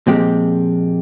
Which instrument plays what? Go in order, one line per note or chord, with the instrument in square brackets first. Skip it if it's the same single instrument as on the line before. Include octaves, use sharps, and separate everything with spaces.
[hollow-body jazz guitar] A#2 F3 G#3 C4 G4